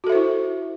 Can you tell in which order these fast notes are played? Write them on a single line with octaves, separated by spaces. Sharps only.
F#4 A4 E5 C5 E4